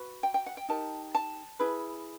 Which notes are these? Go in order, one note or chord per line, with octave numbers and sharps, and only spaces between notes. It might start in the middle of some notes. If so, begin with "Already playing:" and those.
Already playing: F#4 B4
G5
G5
F#5
G5
D#4 G4 A#4 A5
A5
E4 G#4 B4